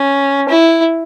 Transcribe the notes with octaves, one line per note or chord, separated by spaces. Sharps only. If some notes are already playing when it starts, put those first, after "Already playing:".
Already playing: C#4
E4